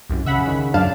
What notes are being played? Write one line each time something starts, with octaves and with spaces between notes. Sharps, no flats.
C2 F#2
C#3 E5 F#5 B5
D#3
F#2 D4 F5 A5